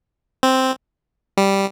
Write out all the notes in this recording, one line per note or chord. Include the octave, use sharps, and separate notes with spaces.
C4
G3